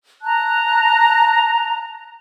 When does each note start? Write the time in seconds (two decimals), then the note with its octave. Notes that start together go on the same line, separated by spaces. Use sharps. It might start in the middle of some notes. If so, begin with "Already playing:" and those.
0.22 A5 A#5 F#6